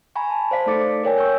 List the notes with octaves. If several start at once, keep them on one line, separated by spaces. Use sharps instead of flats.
G#5 A#5 B5 C#6
A5
C5 D5 F5 B6
A3 D#4 A4 D6 A6 C#7
A#4 C#5 G5 G#5
C#6 E6 G6